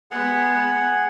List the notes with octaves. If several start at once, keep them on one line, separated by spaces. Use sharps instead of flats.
G#3 B3 G#4 F#5